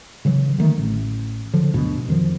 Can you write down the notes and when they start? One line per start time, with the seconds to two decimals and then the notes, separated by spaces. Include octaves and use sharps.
0.25 C#3 E3 F#3
0.59 D3 D#3 A3
0.78 A1
1.54 D3 F3 F#3
1.73 D2 G2 B2
2.08 F2 D#3 F3